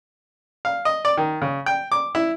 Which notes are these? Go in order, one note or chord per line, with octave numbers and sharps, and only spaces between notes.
F5
D#5
D5
D#3
C#3
G5
D6
E4